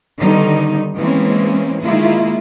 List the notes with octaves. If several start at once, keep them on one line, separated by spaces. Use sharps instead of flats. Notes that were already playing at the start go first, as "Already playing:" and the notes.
D3 D#3 G3 B3 D#4
E3 G#3 A#3 C4 C#4
D#3 G#3 A#3 E4 F4